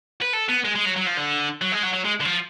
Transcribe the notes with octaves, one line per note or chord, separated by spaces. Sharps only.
B4
A4
B3
G#3
G#3
F#3
F#3
F3
D3
F#3
G#3
F#3
F#3
G#3
D3
F3